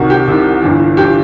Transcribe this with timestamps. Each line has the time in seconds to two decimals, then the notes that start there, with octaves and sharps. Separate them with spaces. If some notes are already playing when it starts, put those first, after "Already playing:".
Already playing: C2 C3 D#3 F#4
0.10 G4
0.28 C2 C3 D#3 E4
0.62 G1 G2 E3
0.97 G2 E3 G4